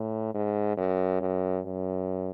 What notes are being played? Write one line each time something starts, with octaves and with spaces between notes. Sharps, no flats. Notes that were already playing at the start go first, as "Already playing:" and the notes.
Already playing: A2
G#2
F#2
F#2
F#2